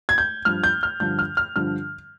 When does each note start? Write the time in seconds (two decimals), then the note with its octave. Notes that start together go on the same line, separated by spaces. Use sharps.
0.09 G#6
0.18 G6
0.45 G2 F3 F6
0.64 G6
0.83 F6
1.00 G2 D3 F3 G6
1.19 F6
1.37 F6
1.56 G2 D3 F3 F6